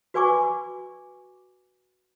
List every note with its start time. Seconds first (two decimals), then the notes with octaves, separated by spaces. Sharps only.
0.14 F#4 B4 D5 G#5 C#6 D6